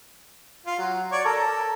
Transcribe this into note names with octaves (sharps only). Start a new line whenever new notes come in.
F4
F#3
C#5 D5
A4 A#4